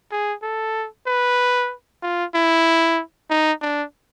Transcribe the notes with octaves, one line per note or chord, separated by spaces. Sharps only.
G#4
A4
B4
F4
E4
D#4
D4